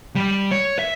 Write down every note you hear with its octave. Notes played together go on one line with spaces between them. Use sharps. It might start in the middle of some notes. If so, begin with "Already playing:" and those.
G3
C#5
E5